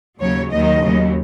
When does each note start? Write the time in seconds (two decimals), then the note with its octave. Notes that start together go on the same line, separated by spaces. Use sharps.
0.20 D#2 C#3 F#3 C#5
0.51 D#2 D#3 F#3 D#5
0.82 D#2 C#3 F#3